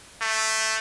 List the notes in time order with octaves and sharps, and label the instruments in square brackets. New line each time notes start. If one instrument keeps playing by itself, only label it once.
[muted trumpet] A3